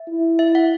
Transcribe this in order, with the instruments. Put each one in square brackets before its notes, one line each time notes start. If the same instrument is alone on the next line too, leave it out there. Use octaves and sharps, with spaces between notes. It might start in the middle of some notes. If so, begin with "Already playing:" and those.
Already playing: [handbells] E5
[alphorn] E4
[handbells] E5
F#5